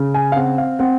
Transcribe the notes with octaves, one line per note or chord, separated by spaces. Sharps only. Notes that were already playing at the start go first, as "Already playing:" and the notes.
Already playing: C#3
G#5
F5
C4 F#5
F5
C4 F#5